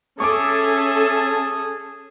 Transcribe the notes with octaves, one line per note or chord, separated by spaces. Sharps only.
C#4 G#4 A4 E5 G#5 A5 C#6 D6